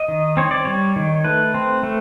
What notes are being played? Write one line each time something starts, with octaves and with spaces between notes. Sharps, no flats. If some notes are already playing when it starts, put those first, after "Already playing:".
Already playing: D#5
D#3
C4 C#5
D5
G3 C#5
D#3
A3 B4
C4
A3